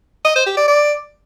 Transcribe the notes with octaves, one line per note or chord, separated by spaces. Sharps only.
D#5
C5
G4
D5
D5